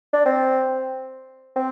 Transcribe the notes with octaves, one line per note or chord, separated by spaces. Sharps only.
D4
C4
C4